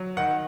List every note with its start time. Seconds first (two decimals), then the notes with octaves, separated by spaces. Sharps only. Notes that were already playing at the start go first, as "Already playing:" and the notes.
Already playing: F#3
0.17 D#3 F#5